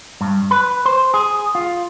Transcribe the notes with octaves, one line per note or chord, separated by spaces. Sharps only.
G2
B4
C5
G#4
F4